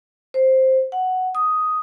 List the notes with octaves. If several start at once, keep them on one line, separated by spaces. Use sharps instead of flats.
C5
F#5
D#6